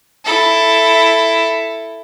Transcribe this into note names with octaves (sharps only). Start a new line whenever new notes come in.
E4 A4